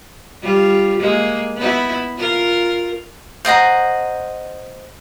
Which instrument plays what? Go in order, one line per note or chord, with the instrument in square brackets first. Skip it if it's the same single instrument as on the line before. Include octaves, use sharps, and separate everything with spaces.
[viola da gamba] G3 F4
G#3 A#3
B3 E4
F4 A#4
[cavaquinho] C5 D#5 F#5 A#5